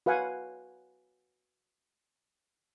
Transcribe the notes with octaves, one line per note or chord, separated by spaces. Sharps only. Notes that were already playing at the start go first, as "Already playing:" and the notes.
F#4 B4 F5 F#5 G#5